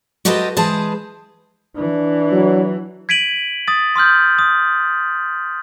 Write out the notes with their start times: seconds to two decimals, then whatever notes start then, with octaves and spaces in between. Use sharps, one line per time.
0.25 F#4 G4 A4 B4 C5 D#5
0.57 E3 G#3 G#4 B4 C5 A5
1.76 E3 D4
2.32 F#3
3.09 G#6 B6 D7 D#7 F#7
3.68 D#6 A6
3.96 C6 D#6 F6 G6
4.39 D#6